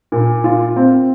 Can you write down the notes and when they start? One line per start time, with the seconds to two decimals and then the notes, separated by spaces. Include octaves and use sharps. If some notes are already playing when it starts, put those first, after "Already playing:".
0.12 A#2
0.44 F4
0.76 C4